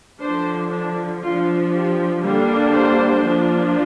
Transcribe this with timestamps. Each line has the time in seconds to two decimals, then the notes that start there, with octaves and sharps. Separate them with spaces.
0.21 D3 F3 D4 C5
0.71 D4
1.22 F3 D4 F4
1.73 G4
2.23 D3 G3 A#3 D4
2.73 C5
3.24 F3 A#3 D4